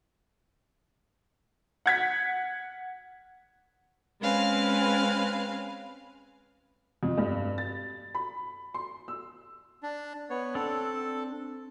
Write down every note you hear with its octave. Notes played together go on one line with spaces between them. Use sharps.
F#5 G#6 B6
G#3 C4 C#4 B4 F5 G#5
F2
G2
A6
B5
C6
E6
D4
B3 C#5
C4 D4 A4